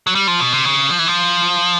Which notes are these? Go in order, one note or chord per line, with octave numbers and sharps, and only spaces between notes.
F#3
G3
F3
B2
C3
C#3
F3
E3
F3